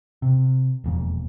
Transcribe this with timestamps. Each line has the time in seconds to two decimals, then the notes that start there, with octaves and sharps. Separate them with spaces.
0.22 C3
0.84 E1 F2 A#2